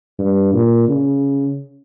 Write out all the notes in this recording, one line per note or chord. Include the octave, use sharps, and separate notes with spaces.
G2
A#2
C#3